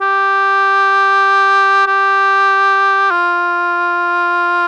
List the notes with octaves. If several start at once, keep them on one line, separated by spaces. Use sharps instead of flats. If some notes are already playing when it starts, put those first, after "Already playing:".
G4
G4
F4